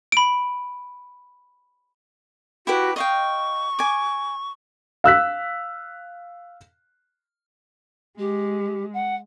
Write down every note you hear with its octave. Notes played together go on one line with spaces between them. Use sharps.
B5 D7
E4 F#4 G4 B4
D#5 F5 G5 C#6
G#5 D6
F5 E6 F#6 B6
G#3 G4
F#5